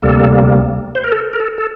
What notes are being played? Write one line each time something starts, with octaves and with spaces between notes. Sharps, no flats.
D2 C3 G3 A#3 A4
C5
A#4
A4
A#4
A4
A4